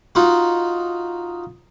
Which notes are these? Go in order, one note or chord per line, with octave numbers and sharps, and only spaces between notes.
D#4 F4 F#4